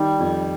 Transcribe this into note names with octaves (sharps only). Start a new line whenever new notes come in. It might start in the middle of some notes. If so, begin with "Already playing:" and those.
Already playing: D#3 G3
F2